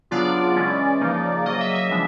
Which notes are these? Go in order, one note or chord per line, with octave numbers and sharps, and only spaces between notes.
C#3 F#3 B3 D4 F4 D5
E3 G#3 C#4
C#3 F3 A#3 D#4
C#3 F#3 A#3 D#5
E5
E5
F3 G#3 B3 D4